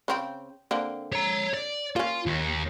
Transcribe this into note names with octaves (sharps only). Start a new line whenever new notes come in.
C#3 C4 G5
D3 A#3 C4
C#5 A#5
D5
A#3 C#4 F4
D#2